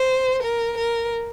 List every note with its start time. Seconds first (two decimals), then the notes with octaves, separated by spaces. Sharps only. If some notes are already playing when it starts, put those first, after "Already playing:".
Already playing: C5
0.43 A#4
0.78 A#4